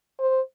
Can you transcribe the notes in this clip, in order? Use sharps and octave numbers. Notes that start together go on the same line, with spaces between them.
C5